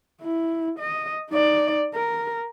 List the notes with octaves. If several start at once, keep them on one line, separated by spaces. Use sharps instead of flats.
E4
D#5
D#4 D5
A#4